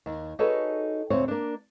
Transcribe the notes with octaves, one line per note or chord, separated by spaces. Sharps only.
D#2
D#4 F#4 G#4 A4 B4 C#5
D2 A#2 C4 C#5
A#3 D4